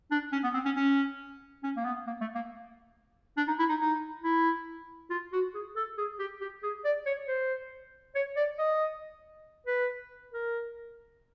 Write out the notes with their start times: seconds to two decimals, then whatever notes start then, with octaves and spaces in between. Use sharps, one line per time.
0.11 D4
0.32 C#4
0.43 B3
0.54 C4
0.65 C#4
0.76 C#4
1.63 C#4
1.77 A#3
1.85 B3
2.07 A#3
2.21 A3
2.35 A#3
3.37 D4
3.47 D#4
3.59 E4
3.69 D#4
3.80 D#4
4.24 E4
5.10 F4
5.33 F#4
5.54 G#4
5.76 A4
5.98 G#4
6.19 G4
6.41 G4
6.63 G#4
6.84 D5
7.06 C#5
7.28 C5
8.15 C#5
8.36 D5
8.58 D#5
9.67 B4
10.33 A#4